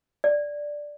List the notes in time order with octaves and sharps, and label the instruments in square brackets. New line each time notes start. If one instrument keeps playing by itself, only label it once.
[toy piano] D5